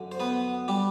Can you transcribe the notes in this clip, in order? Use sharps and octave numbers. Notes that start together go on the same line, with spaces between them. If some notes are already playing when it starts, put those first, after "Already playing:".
Already playing: F#2 D3
C5
B3 B4
G3 G4